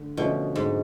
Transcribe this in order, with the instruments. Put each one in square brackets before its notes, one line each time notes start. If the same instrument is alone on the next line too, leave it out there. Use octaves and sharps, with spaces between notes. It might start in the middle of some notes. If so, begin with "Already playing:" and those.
Already playing: [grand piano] D3 A3
[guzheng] B2 [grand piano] D3 F3 A3 C#4 F#4
[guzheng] G#2